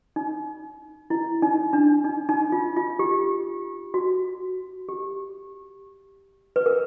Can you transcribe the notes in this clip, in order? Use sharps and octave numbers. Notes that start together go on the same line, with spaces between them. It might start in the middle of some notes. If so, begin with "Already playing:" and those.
D#4
E4
D#4
D4
D#4
D#4
F4
F4
G4
F#4
G4
B4
A#4